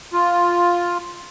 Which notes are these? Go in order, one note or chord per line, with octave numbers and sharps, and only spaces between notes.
F4